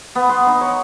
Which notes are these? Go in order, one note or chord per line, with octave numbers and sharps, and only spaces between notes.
B3
C6
D#4
C#5